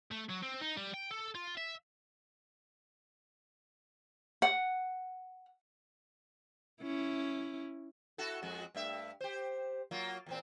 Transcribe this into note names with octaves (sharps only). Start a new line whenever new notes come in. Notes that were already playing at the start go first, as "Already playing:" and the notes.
A3
F#3
C4
D#4
G3
G5
A4
F4
E5
F#5
C#4 E4
E4 F#4 A4
F2 G#3 F#4
G2 A3 E5
G4 C5
F#3 A#3 F4
E2 A#2 C4